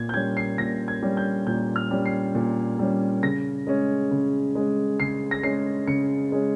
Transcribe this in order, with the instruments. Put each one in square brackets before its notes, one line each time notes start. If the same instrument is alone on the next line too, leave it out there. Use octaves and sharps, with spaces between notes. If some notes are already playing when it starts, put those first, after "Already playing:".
Already playing: [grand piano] A#2 G#6
G6
G3 C#4 G#6
C7
A#2 A#6
G#6
G3 C#4
G6
A#2 G6
F6
G3 C#4
C7
A#2
G3 C#4
C#3 A#6
G#3 C#4
C#3
G#3 C#4
C#3 C7
A#6
G#3 C#4 C7
C#3 C#7
G#3 C#4